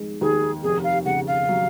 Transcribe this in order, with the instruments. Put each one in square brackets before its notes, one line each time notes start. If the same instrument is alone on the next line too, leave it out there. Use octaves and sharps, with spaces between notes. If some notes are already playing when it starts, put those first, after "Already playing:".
Already playing: [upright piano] F1 D#3 G#3
[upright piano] D#2 [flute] G#4
[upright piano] F1 [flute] G#4
[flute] F5
[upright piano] C#3 [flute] F#5
[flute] F5
[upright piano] F#3